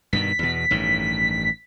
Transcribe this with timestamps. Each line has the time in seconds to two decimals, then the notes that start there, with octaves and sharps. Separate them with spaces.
0.13 G2 B2 D#3 B6
0.39 E2 B2
0.71 A1 G2 D#3